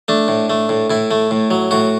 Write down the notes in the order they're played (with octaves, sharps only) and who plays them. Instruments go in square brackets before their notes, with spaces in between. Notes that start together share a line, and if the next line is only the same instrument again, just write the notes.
[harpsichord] A3 D4
A2
A3
A2
A2 E4
A3
A2
F#3
A2 F#4